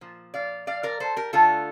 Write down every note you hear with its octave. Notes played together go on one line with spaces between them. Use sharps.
A#2 F3
D5 F5
D5 F5
A#4 D5
A4 C5
G4 A#4
D3 A3 F4 A4